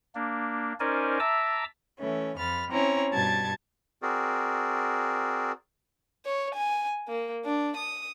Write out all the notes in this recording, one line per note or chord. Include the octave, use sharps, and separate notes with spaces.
A#3 D4
C#4 D#4 A#4 C5 D5 G#5
E5 A5 A#5 D6 E6
E3 A3 C#4
F2 B5 F6 A6
C4 C#4 E4 C#5 A#5
G2 B2 G3 A5 G#6 A6
C4 F#4 G#4 A#4 D5
C#5
G#5
A#3
D4
D#6